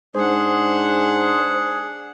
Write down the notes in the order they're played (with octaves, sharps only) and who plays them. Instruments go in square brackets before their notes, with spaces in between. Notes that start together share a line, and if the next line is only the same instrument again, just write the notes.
[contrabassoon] G#2 [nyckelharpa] D4 F#5 [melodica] G#4 [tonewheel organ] C5